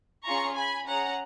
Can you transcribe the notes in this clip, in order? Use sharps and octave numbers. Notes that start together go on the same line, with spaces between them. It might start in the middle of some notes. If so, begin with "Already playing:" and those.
C#4 F4 G#4 A#5 C#6
G#5 B5
C#4 G#4 F#5 A#5